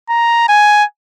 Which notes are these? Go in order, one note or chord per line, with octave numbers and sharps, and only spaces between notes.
A#5
G#5